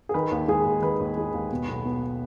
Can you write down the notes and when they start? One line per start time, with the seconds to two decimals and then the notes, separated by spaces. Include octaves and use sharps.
0.09 G#4
0.14 D#3 B4
0.31 D#2
0.48 G#3 G#4
0.66 D#2
0.82 D#3 B4
1.00 D#2
1.17 G#3
1.34 D#2
1.51 B2
1.68 B1
1.85 B3